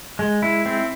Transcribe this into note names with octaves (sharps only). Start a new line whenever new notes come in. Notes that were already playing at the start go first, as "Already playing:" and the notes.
G#3
E4
C4